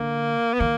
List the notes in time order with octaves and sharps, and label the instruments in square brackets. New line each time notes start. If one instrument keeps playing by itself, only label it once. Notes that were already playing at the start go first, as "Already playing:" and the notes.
Already playing: [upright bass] D3 [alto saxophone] A#3
[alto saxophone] B3
[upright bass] D#3 [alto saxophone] A#3